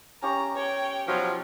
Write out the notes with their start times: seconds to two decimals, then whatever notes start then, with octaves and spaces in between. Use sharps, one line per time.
0.22 C#4 G4 A#5 C#6
0.56 C#5 G5
1.08 B2 F3 F#3 D#4 F4